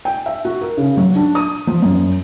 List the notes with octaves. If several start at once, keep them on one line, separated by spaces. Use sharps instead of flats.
G5
E5
F#4
A#4
C#3
F#3
D4
D#6
F3
F#2